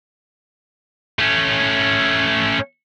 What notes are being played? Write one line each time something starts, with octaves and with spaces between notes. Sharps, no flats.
A3 C#4